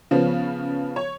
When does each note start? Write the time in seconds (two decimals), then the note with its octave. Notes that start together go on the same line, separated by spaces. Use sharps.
0.11 C#3 F3 B3
0.96 C#5